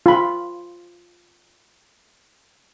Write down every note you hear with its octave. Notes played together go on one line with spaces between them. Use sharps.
F4 B5